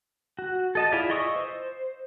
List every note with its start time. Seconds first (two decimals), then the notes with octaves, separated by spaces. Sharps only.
0.39 F#4
0.75 A4 D#5 A5
0.92 E4 F4 G#4 D5 E5
1.10 D#5 C#6 D#6 E6
1.36 C5